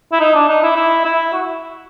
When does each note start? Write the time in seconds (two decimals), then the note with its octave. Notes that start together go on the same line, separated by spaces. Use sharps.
0.12 E4
0.20 D#4
0.35 D4
0.48 D#4
0.63 E4
0.76 E4
1.05 E4
1.33 F#4